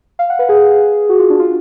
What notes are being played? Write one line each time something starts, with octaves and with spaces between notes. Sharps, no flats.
F5
F#5
B4
G#4
F#4
F4
D4
F4